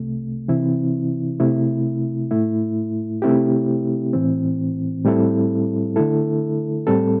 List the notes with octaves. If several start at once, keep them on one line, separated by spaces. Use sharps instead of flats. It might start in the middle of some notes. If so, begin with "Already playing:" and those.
Already playing: C2 C3 A3
C3 E3 C4 E4
C3 A3 E4
A2 A3 E4
C3 A3 C4 E4 G4
A2 E3 C4
A2 G3 C4 E4 A4
D3 A3 E4 A4
A2 G3 C4 A4